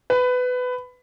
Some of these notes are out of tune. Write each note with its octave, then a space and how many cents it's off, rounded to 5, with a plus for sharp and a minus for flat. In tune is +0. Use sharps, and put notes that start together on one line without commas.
B4 +20